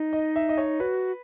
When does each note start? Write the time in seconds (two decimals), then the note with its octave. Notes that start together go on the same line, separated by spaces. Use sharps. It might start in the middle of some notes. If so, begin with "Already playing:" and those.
Already playing: D#4
0.13 D#5
0.36 E5
0.49 D#5
0.58 C#5
0.80 F#4 B4